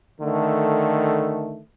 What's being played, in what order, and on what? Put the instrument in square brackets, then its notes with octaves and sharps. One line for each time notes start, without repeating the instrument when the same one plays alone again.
[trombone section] D3 D#3 A3